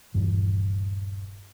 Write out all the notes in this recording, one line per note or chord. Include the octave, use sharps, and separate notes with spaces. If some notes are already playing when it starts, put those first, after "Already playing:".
D#1 G2 E3